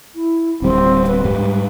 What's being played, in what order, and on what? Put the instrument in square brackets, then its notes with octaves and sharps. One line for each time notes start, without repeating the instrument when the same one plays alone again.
[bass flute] E4
[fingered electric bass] D1 G3 [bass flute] C4
[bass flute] B4
[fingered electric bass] G#2 G3